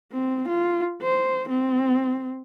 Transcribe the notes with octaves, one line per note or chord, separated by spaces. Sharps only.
C4
F4
C5
C4